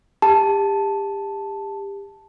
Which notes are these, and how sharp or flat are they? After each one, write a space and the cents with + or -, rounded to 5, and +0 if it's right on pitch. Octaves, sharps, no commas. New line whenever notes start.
G4 +30 A5 +0